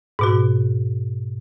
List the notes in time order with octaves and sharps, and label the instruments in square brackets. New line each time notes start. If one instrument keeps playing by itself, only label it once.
[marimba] G#2 B2 F#4